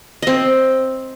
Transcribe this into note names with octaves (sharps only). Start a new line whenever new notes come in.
C4 D#5